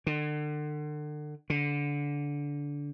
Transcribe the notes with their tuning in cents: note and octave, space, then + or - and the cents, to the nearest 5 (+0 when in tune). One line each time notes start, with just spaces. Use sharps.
D3 +35
D3 -20